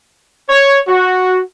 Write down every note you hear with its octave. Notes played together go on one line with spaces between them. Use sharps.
C#5
F#4